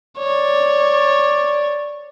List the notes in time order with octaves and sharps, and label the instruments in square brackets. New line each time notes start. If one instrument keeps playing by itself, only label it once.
[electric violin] C#5 [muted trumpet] D5